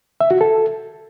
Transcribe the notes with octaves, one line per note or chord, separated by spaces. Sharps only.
E5
F#4
A4